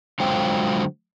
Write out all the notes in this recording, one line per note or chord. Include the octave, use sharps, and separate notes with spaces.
D3 F#3 G#3 F4 C5 G5